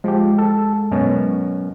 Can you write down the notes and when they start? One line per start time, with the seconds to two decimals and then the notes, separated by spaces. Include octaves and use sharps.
0.04 F3 G#3 G4
0.38 A4
0.91 F#2 B2 C#4